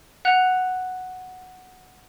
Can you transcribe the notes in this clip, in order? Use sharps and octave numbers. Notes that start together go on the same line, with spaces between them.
F#5 F#6 F7